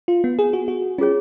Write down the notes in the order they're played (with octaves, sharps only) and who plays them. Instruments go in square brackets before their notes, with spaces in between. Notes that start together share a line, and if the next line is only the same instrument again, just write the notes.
[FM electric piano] F4
B3
G#4
F#4
F#4
[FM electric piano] C#4 [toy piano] F4 G#4 C#5